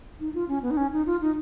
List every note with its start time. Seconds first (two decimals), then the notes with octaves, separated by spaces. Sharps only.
0.20 D#4
0.34 F4
0.48 C#4
0.62 B3
0.71 D#4
0.77 C#4
0.93 D#4
1.06 F4
1.21 D#4